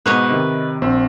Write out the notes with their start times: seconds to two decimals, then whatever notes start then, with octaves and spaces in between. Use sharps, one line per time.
0.06 G#2 B2 B4 C#5 D#5
0.30 C3 D#3
0.82 A#1 C4 E6